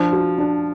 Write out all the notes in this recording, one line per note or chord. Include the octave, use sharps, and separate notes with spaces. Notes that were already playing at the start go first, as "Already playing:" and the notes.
Already playing: F3 D4
F#4
D4